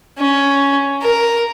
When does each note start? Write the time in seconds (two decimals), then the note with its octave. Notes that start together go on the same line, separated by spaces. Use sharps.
0.18 C#4
1.02 A#4